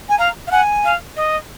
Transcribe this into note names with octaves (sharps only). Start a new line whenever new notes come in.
G#5
F5 A#5
F5
F#5 G#5
F5
D#5